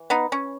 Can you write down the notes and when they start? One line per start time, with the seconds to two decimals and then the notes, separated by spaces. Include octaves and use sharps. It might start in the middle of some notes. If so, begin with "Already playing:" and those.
Already playing: E3
0.10 B3 D#4
0.32 C#4